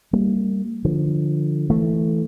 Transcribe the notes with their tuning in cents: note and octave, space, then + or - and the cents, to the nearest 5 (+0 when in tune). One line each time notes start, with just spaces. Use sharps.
G3 +0 A#3 -25
D3 +15 F3 +0
E3 +0 A3 +0